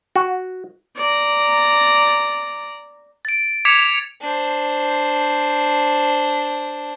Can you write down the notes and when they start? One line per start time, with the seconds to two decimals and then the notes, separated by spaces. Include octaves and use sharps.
0.16 F#4
0.97 D5 A#5
3.25 A6 D7
3.65 D6 G#6 B6 C#7 E7 F7
4.21 D4 C5